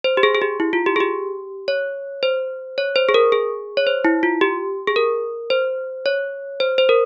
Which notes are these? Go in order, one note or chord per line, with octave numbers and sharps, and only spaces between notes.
C5
G4
G#4
G#4
G4
E4
F4
G4
G#4
G4
C#5
C5
C#5
C5
G#4
A#4
G#4
C#5
C5
E4
F4
G4
G#4
A#4
C5
C#5
C5
C5
A#4